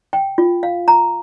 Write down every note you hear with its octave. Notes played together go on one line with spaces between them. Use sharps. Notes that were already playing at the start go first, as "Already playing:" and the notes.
G5
F4
F5
A#5